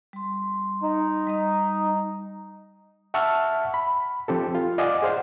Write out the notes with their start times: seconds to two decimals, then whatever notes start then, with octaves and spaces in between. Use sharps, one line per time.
0.13 G3 C6
0.83 D#4
1.27 G3 D#5 D#6
3.14 E5 F#5 A5 C#6 E6 F6
3.74 B5
4.28 F3 C4 G4 A4
4.55 F4
4.78 D5 D#5 F5 F#5 G#5 D6
5.02 G#4 C5 F5 F#5